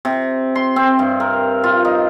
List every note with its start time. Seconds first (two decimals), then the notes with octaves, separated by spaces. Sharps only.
0.05 C3
0.55 C6
0.76 C4
0.99 G2
1.20 A#4
1.64 F4
1.85 D#4